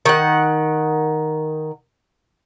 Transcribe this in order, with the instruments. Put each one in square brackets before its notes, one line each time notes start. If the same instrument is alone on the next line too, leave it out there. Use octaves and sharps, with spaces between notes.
[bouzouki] D#3 F#5